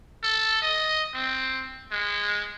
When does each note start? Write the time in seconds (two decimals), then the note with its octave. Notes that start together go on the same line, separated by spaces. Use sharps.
0.23 A4
0.62 D#5
1.14 C4
1.91 G#3